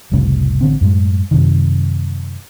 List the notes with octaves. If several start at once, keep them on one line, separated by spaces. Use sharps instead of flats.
F1 C2 A2 C#3
A1 D3 C4
F#2 A2 G#3
F#2 C3 D#3